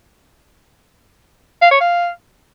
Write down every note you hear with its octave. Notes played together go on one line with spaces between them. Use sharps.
F5
C#5
F5